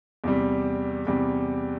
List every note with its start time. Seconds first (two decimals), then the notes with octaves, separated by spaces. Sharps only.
0.24 E2 C3 G3
1.07 E2 C3 G3